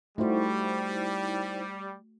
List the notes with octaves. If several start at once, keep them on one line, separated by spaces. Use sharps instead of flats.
G3 A3 D#4 E4 F#4 C5